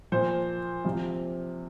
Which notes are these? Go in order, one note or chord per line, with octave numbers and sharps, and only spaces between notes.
A#2 F3 C5
C3 F3